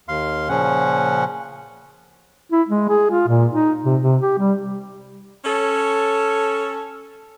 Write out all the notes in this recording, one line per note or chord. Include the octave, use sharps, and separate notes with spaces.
D#2 F5 C6
A#2 C#3 F3 C#4 F#5
E4
G#3
G#4
F4
A#2
D#4
C3
C3
G4
G3
C#4 A4 C#5